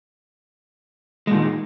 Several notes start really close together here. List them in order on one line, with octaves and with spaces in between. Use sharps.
G#3 A#2 D#3